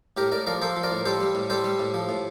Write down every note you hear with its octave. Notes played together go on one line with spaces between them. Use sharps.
A2 G4 A#4
A2 A#4 D5
F3 A#4 D5
F3 A4 C5
F3
A#4 D5
A2
G3 A4 C5
G3
A2
G3 A4 C5
G3
A2
F3
A2